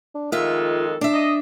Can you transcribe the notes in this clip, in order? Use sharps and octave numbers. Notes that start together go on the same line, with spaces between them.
D4
F2 D#3 G#3 F4 A4 E5
D4 E5
D#5